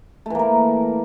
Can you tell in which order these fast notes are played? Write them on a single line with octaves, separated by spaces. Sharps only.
A3 E3 A#3 A#4